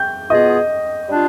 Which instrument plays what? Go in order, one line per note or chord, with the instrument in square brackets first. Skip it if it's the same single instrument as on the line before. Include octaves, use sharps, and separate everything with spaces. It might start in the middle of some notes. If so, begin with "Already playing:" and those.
Already playing: [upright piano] G5 G6
[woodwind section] B2 B3 F4 G#4 [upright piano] D#5 D#6
[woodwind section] G3 D4 F4